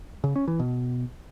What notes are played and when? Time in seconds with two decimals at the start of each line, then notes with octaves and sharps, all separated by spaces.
0.24 C#3
0.36 C#4
0.48 E3
0.59 B2